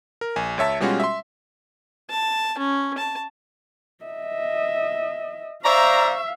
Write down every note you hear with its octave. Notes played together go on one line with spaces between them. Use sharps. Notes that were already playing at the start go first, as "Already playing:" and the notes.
A#4
A#1 G#5
C#2 C#5 E5 A5
B2 G3 G#3 C#4 F4 F#4
E5 C6
A5
C#4
A5
D#5 E5
C5 D5 E5 F5 A#5 C#6